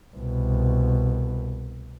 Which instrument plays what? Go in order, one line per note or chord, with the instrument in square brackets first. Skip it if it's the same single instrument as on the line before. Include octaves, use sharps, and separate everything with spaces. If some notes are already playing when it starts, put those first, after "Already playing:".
[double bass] C2 B2